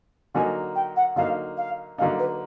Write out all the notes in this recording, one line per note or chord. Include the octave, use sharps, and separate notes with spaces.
D3 F#3 A#3 D#4 G#5
G5
F#5
D3 F#3 A#3 D#4 F5
F5
D3 F#3 A#3 D#4 F5
B4